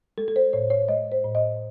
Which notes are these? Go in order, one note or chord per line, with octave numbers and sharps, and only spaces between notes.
G#3 A4
A4
C5
A2 C#5
C#5
G#3 D#5
C5
A2
D#5